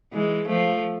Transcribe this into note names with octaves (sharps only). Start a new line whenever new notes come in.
E3 G#3
F3 A3